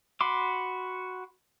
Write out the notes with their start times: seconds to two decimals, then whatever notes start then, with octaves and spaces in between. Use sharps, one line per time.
0.21 F#4 B5 C6 D6